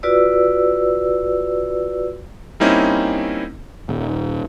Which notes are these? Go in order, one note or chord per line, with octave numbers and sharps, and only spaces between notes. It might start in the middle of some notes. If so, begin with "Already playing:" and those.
F4 F#4 B4 D5 E6
G3 A#3 C4 C#4 D#4 E4
D#1